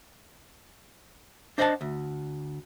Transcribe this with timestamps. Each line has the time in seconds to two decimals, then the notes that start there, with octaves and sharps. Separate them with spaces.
1.58 D4 C5 D#5 F5 F#5 A5
1.81 D2